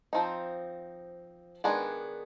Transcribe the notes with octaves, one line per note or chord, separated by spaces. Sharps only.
F3 C4 D#4
D#3 G#3 B3 D4 G#4